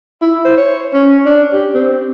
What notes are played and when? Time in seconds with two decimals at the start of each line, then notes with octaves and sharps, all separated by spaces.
0.22 E4
0.44 C5
0.57 C#5
0.94 C#4
1.25 D4
1.53 G4
1.74 C4